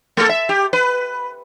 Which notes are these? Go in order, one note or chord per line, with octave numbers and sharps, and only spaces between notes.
A3 A4
E5
G4
B4